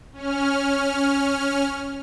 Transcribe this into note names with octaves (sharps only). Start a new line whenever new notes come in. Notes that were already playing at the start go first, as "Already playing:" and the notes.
C#4 F6